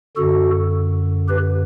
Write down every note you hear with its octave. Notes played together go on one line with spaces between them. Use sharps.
F#2 D3 F#4 A4
G4 B4